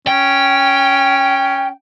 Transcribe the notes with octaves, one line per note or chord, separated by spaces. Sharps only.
C#4 G5